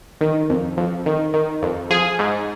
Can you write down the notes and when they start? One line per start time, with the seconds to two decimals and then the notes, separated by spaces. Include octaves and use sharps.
0.21 D#3
0.50 F2
0.77 F2
1.06 D#3
1.34 D#3
1.62 F2
1.90 F3 G#4
2.19 G#2